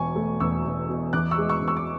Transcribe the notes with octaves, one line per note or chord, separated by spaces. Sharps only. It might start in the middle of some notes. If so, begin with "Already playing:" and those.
Already playing: E1 B2 G#5 C#6
A3
E2 C#6 E6
E1
B2
E2 D6 F#6
C#6 E6
G#3
C#6 E6
E2
C#6 E6
D6